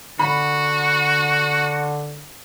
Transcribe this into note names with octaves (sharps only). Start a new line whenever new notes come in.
D3 F#4 B5